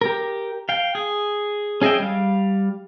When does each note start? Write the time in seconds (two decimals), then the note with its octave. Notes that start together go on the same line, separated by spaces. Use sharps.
0.01 G4 A#4
0.69 F5 G5
0.95 G#4
1.82 C#4 G#4 D#5 E5 G5
2.00 G3 F5